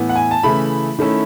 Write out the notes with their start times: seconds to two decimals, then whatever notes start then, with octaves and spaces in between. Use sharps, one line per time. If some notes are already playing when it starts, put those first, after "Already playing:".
Already playing: A2 E3 B3
0.09 F#5
0.15 G#5
0.31 A5
0.43 C#3 E3 A3 E4 B5
0.99 D#3 A3 C#4 E4